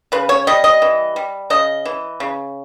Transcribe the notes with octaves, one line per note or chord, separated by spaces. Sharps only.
C#3 B4
C#5
G3 D#5
D#5
E3
G3
C#3 D#5
E3
C#3